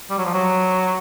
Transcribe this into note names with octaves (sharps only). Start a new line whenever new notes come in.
G3
F#3
F3
F#3